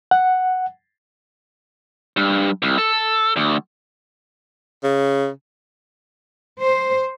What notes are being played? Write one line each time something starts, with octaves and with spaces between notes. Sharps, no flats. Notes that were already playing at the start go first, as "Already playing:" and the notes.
F#5
G2
C2
A4
D2
C#3
C5